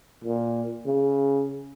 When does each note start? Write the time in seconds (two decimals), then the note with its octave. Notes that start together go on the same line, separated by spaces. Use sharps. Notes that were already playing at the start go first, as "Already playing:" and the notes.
0.24 A#2
0.86 C#3